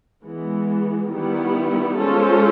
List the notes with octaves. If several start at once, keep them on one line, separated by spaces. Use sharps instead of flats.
E3 G#3 B3
D#3 G3 B3 E4
G#3 C#4 F4 A4 C5